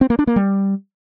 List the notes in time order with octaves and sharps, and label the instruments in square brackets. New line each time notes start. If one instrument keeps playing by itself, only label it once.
[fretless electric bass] C4
A#3
D4
A#3
G3